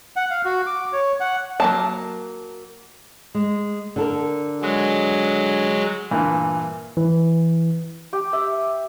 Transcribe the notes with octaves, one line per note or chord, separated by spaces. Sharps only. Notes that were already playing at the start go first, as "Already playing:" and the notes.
F#5
F5
F#4
D6
C#5
F#5
F#3 A#3 A5
G#3
D3 A4 A#4
F#3 G#3
G2 A#2 E3
E3
G4
E5